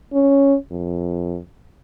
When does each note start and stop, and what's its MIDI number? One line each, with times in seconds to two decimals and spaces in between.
0.14 0.56 61
0.71 1.39 41